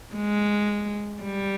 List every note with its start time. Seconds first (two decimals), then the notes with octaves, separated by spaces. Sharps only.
0.15 G#3
1.22 G3